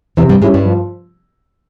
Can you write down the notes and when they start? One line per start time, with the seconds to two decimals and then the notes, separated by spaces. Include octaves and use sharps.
0.17 E2 C3 E3
0.29 G2 G3
0.42 G#2 G3 G#3 C#4 E4
0.54 G2 G3
0.65 F3